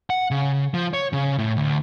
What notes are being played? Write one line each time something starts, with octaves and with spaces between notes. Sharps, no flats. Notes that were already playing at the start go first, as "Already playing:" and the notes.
F#5
C#3
F3
C#5
C#3
A2
D2